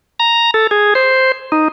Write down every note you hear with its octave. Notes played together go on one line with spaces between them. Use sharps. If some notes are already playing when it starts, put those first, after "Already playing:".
A#5
A4
G#4
C5
D#4